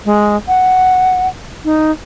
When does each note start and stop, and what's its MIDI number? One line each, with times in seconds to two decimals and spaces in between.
0.05 0.36 56
0.48 1.28 78
1.65 1.91 63